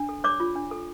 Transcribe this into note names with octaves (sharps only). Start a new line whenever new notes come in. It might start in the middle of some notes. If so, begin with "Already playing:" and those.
Already playing: D4
A4
C#5 D5 D6
F4
D4
A4